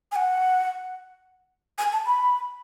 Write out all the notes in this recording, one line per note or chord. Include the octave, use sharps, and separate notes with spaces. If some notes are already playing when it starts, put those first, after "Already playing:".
G#5
F#5
G#5
A5
B5